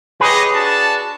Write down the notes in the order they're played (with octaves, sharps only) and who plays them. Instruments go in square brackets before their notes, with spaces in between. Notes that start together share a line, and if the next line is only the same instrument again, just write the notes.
[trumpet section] G4 C#5 D#5 [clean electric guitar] G#4 B4
[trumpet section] D4 F#4 A5